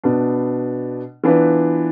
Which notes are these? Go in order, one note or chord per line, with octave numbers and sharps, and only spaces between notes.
B2 B3 D4
E3 B3 D4 F4 B4